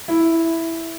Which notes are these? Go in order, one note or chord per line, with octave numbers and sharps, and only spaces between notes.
E4